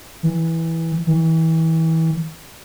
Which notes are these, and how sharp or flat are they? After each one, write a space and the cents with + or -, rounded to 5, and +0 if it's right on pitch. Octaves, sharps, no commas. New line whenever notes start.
E3 -10
E3 -30